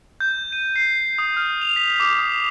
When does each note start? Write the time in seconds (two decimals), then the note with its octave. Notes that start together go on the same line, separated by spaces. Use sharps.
0.20 G6
0.52 D#7
0.76 C7
1.18 D#6
1.36 F6
1.61 F7
1.76 B6
2.00 D6
2.19 D#6